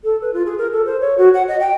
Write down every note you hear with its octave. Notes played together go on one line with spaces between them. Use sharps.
A4
B4
F4
G#4
A#4
A4
C5
C#5
F#4
F#5
D#5
G5